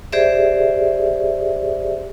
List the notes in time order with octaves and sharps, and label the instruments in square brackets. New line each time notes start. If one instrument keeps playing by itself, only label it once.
[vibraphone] G4 G#4 C5 D5 E5